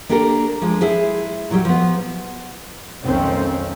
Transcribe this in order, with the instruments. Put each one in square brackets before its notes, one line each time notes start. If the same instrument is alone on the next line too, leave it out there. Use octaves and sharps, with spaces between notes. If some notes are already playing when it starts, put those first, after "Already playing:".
[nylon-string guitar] A#3 D4 G4 A4 A#4
F3 G#3 D4
E4 G#4 C5
A#2 F#3 G3
F3 B3
[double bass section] B1 F2 D#3 A3 C4 C#4